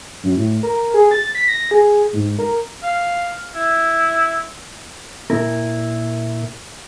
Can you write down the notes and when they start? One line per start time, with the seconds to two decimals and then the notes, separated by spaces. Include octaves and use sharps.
0.23 F#2
0.36 A2
0.63 A#4
0.94 G#4
1.11 A6
1.35 B6
1.48 A#6
1.71 G#4
2.13 G#2
2.39 A#4
2.83 F5
3.55 E4
5.30 A#2 E4 A#4